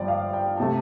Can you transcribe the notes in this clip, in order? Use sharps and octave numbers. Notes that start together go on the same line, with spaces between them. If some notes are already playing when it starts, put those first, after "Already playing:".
Already playing: G1 G2 F3 D5 G5
F5
G5
C3 A3 A5